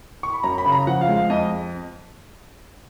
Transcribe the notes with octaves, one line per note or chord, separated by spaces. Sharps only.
C#6
B5
F#2 A#5
B5
C#3
A#5
F3 F#5
F5
G#3
F5
F2 D#5